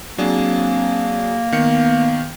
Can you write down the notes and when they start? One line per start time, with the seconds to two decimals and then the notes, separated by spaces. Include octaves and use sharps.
0.18 F#3 A#3 C4 D4 G#4
1.52 D#3 B3 C#7